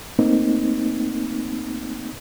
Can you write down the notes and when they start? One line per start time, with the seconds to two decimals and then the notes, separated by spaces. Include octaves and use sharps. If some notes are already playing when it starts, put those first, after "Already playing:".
0.19 A3 A#3 C4 D#4